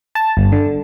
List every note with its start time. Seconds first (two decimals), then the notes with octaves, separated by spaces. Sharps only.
0.15 A5
0.37 G1
0.52 D3